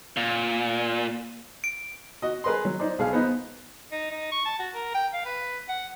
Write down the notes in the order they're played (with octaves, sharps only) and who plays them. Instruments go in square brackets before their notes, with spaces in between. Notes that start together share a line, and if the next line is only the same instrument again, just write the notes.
[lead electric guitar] A#2
[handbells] D7
[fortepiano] F#4 D#5
G#4 A#4 B4 D#5 C6
F#3
D#4 C5 D5
B1 G#4 F5
B3 D#4 C5
[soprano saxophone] D#4
D#4
C#6
A5
F#4
A#4
G5
F5
B4
F#5